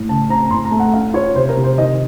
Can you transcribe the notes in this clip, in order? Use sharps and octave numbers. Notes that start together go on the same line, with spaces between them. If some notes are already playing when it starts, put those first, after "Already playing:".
Already playing: A2
C#3 A5
C4 A#5
A2 C6
A#5
A3
F#5
C#4 F5
F4 C#5
C3 C5
A#4
C3
C5
D#3 D#5